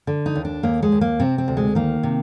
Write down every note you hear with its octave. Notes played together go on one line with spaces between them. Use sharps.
D3
D#4
D#2
D4
D#2 A#3
G#3
D#2
A#3
C3 C4
C4
D2
G#3
D#3 A#3
C3